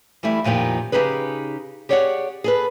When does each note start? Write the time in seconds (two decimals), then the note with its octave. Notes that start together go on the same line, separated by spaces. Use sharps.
0.23 E3 G3 A3 E4
0.44 F2 A#2 D#3 F3 G4
0.92 C#3 E3 D#4 G4 G#4 B4
1.89 G4 G#4 C#5 D5 E5 F#5
2.44 G#4 A4 B4